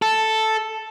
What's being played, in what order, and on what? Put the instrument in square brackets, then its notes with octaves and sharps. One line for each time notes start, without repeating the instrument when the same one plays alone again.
[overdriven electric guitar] A4